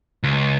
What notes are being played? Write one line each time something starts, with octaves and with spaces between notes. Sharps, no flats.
C#2